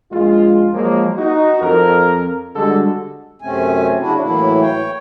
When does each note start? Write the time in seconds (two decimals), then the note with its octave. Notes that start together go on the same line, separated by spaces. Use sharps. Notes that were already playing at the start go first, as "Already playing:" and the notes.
0.12 A#1 G#3 F4
0.73 F3 F#3 G#3 A#3
1.18 D#4 F#4
1.61 F2 A#4
2.56 D3 G3 G#3 F#4 A4
3.42 F#2 C3 A3 C4 C#4 G#5
3.99 C#3 F#3 D4 E4 F#4
4.21 A2 E3 F#3 A#3 E4
4.61 C#5 G5